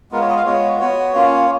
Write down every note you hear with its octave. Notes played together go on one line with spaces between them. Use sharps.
G#3 B3 F4 A#4
C#5
D#5
F5
G#3 B3 F4 C#5
B3 F#4 C#5
A#3 C#4 F4